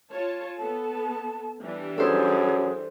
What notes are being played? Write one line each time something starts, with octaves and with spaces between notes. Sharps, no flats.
F4 C#5 A5
B3 A4 A5
E3 G3 D4
F#2 G#4 A4 C5